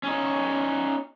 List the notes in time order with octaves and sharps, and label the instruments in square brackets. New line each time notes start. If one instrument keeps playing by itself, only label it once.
[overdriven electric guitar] C#4 D#4